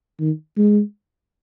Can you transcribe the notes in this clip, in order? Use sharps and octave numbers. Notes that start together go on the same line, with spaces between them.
D#3
G#3